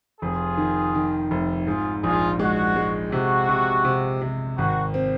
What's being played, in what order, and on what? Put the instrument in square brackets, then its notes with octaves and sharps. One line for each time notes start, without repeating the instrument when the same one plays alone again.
[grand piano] F1 [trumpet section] F4 G#4
[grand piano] D#3
D#3
F1
[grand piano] G#2 [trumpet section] F4 G#4
[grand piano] A#1 [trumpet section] F4 G#4
[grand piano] G#3 [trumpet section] F#4
[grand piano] G#3
[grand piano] C3 [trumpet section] F#4
[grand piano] C3
C3
C3
[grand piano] G#1 [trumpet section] F#4
[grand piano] C4